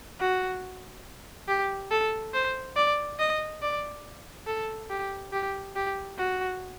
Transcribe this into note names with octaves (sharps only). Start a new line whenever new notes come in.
F#4
G4
A4
C5
D5
D#5
D5
A4
G4
G4
G4
F#4